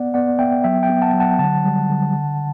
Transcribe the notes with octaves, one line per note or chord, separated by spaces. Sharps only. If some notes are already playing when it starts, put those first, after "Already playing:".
Already playing: B3 D5 F#5
B3 D5 F#5
B3 E5 G5
F#3 E5 G5
E5 G5
B3
F#5 A5
F#3
F#5 A5
D3 F#5 A5
G3
D3
D3